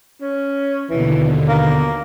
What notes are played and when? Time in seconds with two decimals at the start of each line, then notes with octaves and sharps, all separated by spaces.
0.21 C#4
0.90 D#2 B2 D3 E3
1.48 A#3